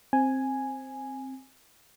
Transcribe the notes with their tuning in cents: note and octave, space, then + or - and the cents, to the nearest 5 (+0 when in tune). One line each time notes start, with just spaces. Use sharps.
C4 +10 G#5 +0